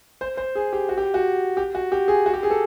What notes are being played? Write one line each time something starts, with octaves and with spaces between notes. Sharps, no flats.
C5
C5
G#4
G4
F#4
G4
F#4
G4
F#4
G4
G#4
F#4
G4
G#4
A4